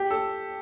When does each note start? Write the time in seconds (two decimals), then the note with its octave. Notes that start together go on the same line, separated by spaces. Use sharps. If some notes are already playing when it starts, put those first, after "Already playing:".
Already playing: G4
0.10 A4